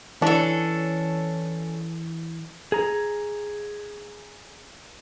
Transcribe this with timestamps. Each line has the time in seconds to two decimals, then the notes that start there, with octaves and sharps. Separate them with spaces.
0.22 E3 C#4 D4 A4
2.72 G#4 A#5